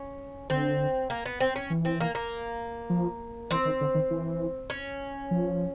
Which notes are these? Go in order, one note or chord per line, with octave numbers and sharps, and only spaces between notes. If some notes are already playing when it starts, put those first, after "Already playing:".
Already playing: C#4
D3 C4
A#3
B3
C4
C#4
E3
C4
A#3
A#3
F3
E3 C4
D#3
D3
D#3
E3
C#4
F3